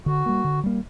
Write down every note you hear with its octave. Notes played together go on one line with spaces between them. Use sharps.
D3 F#4
G3 A#3
D3
G3 A#3